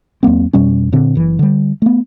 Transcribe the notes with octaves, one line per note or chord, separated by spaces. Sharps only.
E2 F#3 A#3 C4
F2 B2 G3 C#4
A#2 D3 C4
F#1 E3
D3 G3
A3 B3